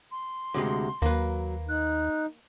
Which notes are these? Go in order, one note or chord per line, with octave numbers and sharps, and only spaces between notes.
C6
D2 C3 G#3
D#2 F#3 A#3 B4
D#4 F#6